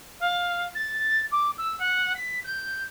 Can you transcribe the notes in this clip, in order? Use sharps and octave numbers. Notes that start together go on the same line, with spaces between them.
F5
A6
D6
E6
F#5
B6
G6